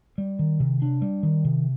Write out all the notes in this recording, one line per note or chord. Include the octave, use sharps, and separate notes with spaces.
G3
D#3
C3
D4
G3
D#3
C3